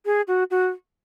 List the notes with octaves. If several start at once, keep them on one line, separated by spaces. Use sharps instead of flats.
G#4
F#4
F#4